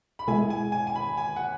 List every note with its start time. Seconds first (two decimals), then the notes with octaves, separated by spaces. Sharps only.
0.19 B5
0.28 B2 G#3 E4 G#4 G#5
0.50 G#5
0.72 G#5
0.87 G#5
0.95 B5
1.17 G#5
1.36 F#5